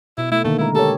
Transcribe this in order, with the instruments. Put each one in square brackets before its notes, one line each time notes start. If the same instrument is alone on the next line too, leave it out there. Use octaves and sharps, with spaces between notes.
[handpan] B2 [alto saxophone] E4
[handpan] A3 [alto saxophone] E4
[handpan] D3 D#3 A#3 [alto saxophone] A3
[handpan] G#3 A#4 [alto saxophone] E4
[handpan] G4 C#5 [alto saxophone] A4